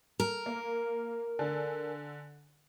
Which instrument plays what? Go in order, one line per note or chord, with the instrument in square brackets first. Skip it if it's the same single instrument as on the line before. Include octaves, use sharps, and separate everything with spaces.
[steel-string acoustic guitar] A#4
[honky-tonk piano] A#3
D3 A4 G#5